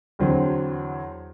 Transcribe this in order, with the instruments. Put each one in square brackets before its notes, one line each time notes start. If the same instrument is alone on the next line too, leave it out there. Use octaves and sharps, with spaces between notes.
[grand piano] E2 D3 F#3 C4